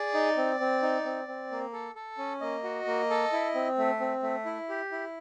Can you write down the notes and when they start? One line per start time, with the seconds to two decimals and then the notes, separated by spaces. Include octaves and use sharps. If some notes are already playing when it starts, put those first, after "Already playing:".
Already playing: G#4 D5
0.14 D#4
0.37 C4
0.60 C4
0.82 D#4
1.05 C4
1.28 C4
1.51 A#3
1.73 A4
1.96 A4
2.18 C#4
2.41 A#3 D#5
2.64 F#4
2.87 A#3
3.10 A4
3.33 E4
3.55 C4
3.78 A3
4.00 C4
4.23 A3
4.46 E4
4.69 G4
4.92 E4